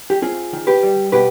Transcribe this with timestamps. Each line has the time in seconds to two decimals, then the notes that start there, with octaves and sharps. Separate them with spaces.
0.10 G4
0.22 C4 F4 G#4
0.53 D#3
0.67 G4 B4
0.82 G3
1.12 B2 G4 B4